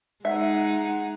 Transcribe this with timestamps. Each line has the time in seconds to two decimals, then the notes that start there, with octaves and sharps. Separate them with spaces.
0.25 G#3 D#4 E5 F#5